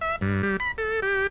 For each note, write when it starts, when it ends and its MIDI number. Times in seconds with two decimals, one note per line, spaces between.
0.01 0.16 76
0.21 0.42 43
0.43 0.57 55
0.60 0.72 83
0.78 1.00 69
1.02 1.27 67